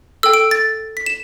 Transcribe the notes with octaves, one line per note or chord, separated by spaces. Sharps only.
A4 G5 E6
D7
A6
B6
E7